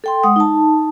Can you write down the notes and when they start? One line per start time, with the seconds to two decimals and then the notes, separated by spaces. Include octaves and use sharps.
0.04 A4 G5 C6
0.23 G#3 F#5 D#6
0.36 D#4 A5